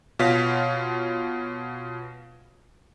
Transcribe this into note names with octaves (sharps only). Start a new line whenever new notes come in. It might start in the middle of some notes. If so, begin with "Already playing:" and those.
B2 F4 C#5 F5 B6